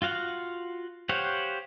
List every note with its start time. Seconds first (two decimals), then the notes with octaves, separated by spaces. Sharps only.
0.02 F4 F#4 F5 F#5
1.09 G4 C5 C#5 F5 F#5